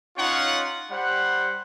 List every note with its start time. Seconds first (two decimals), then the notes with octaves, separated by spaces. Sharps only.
0.17 C#4 D#4 F4 C#5 F#5
0.91 G3 C5 F#5